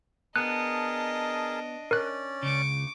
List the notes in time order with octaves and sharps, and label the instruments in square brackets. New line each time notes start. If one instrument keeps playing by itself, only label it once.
[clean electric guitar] B3 [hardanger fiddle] D4 D#5 [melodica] G#4 A#4 A5 [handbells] F#6
[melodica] C#4 D5 [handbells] A#4 F#6
[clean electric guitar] C#2 C#3 [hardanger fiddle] C#6 D6